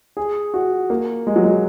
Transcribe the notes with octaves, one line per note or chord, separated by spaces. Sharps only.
G#4
F#4
A#3
G#3
F#3
G#3